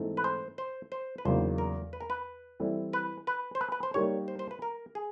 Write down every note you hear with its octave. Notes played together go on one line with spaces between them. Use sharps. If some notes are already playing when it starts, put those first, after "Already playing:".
Already playing: G#2 E3 A3 C4 D#4
B4
C5
C5
C5
B4
E2 C#3 F#3 A#3 D#4 C5
A#4
B4
A#4
B4
E3 G3 C4 E4 A4
B4
B4
C5
B4
B4
C5
G3 A#3 D#4 G4 A#4 C#5
C5
C5
B4
A#4
G#4